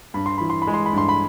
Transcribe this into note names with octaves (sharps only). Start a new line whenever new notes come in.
G2 B5
C6
E3 B5
C6
B5
G#3
C6
B5
G2 C6
B5